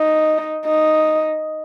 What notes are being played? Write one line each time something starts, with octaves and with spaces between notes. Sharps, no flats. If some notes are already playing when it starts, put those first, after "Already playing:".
Already playing: D#4
D#4